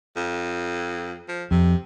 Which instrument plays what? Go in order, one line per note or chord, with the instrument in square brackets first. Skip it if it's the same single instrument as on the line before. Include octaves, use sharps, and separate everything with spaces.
[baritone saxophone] F2
F3
[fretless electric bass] F2 [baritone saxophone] C3